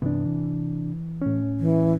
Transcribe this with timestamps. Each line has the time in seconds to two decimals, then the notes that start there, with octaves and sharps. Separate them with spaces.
0.02 G2 C3 E3 B3 D4
0.25 E3
1.22 A2 C#4
1.60 E3